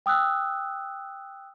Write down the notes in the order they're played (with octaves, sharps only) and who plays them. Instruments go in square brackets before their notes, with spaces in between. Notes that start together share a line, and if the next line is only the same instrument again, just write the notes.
[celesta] G5 D#6 E6 F#6